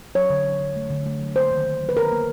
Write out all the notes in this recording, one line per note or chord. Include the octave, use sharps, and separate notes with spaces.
F#3 C#5
D3
F#3
D3
A3
D3
A3
F#3
A#3 C5
D#3
D#3
F#3
B4
D#3 A#4
A#3